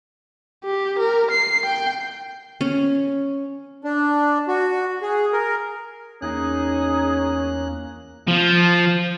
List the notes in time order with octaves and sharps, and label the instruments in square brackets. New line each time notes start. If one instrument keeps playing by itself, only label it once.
[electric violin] G4
A#4
C7
G5
[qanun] C#4
[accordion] D4
F#4
G#4
A#4
[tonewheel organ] E2 A#3 F#6 [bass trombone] C#4 [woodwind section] D#4 G#4
[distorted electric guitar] F3 F4